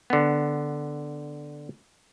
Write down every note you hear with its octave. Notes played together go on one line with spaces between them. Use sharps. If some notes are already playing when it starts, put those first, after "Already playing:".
D3 B3